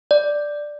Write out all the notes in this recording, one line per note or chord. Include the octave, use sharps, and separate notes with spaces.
D5